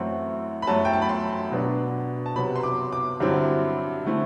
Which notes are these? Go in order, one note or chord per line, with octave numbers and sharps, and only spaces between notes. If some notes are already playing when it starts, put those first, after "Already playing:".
Already playing: F#2 E3 A3 C4 E4 F#5
B5
F#2 F#3 A3 A5
G5
A5
B5
C6
B2 F#3 B3 D4
A5
C3 F#3 B3 B5
C6
D6
D6
G2 D3 F#3 C4 E4
D3 A3 C4 E4